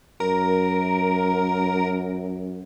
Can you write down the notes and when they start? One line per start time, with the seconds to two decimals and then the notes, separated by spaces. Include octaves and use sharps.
0.20 F#2 A#4